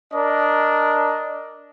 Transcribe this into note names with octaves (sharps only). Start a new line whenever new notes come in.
D4 A#4 D#5